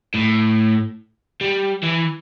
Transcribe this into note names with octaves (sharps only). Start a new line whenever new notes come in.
A2
G3
E3